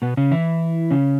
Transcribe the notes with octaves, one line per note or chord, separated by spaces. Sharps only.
B2 B3
C#3 C#4
E3 E4
C#3 C#4